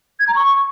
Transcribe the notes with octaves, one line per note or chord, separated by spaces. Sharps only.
G#6
A#5
C#6